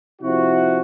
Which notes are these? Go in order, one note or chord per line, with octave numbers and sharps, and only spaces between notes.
C3 F3 E4 F#4